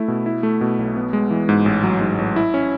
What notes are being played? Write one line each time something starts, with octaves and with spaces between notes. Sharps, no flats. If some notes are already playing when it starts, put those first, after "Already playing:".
Already playing: A3 E4
B2
E4
A3
B2
B1
B3
G#3
E3
G#2
A1
F#3
G#2
A1
E4
C#4